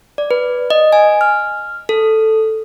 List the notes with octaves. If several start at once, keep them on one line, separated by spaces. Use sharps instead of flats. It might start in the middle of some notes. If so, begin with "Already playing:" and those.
D5
B4
D#5
G#5
F6
A4